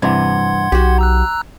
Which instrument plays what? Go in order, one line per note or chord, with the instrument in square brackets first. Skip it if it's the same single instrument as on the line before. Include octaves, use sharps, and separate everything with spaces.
[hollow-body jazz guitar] G2 C3 E3 [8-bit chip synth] F#5 C6 G#6
[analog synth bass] B1 [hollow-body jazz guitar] F#4 G4
[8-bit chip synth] A#5 E6 F#6